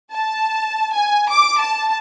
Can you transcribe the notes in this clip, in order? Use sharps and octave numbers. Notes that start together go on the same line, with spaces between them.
A5
G#5
D6
A5